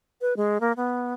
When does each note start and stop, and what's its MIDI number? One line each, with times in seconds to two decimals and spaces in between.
0.21 0.33 71
0.37 0.58 56
0.61 0.72 58
0.77 1.13 59